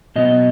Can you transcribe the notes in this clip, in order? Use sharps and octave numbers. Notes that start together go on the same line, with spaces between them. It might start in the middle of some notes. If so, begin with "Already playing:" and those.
B2 F#3 B3 D#5